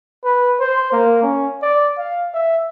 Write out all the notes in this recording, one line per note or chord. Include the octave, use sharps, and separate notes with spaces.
B4
C5
A#3
C#4
D5
F5
E5